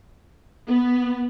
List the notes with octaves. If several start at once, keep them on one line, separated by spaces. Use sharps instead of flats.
B3